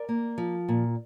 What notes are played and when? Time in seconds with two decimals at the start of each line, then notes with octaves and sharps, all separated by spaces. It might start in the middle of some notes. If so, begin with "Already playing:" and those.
Already playing: A#4 D5
0.09 A#3
0.38 F3
0.68 A#2